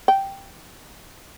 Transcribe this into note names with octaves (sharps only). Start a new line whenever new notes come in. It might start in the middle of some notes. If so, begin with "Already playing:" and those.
G5